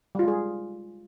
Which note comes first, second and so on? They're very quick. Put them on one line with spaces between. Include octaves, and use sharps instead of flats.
G3 F4 G#3 G#4